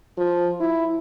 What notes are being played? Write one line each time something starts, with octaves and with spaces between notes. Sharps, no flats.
F3
E4